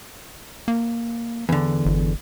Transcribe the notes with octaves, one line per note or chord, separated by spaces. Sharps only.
A#3
E2 D3
G1